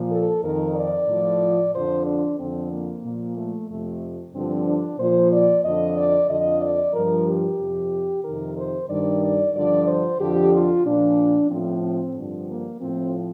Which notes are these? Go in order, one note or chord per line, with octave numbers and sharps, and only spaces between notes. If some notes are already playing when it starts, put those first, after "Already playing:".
Already playing: A#2 F3
A4
F2 D#3 A#4
D5
A2 F3
F2 D3 F3 C5
D4
F2 D3 F3 C4
A#3
A#2 F3
A3
F2 C3 F3 A3
G2 D3 F3 C4
D4
A#2 F3 C5
D5
F2 D3 F3 D#5
D5
F2 D3 F3 D#5
D5
G2 F3 A#4
G4
F2 C3 F3
F2 C3 D#3 A#4
C5
G2 D#3 D5
D5
G2 D3 F3 D5
C5
F2 D3 F3 G4
F4
A#2 F3 D4
A2 F3 C4
C4
G2 D3 F3
A#3
A2 F3 C4